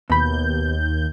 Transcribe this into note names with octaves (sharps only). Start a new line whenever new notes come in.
D#2 B2 B5 G6